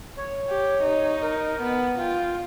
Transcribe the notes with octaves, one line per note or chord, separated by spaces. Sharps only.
C#5
G4
D#4
A#4
B3
F4 G5